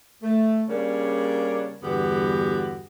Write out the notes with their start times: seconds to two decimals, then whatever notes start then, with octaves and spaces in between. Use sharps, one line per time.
0.22 A3
0.68 C#3 G3 A#3 D4 C#5
1.82 E2 G2 D3 B3 F#4 G4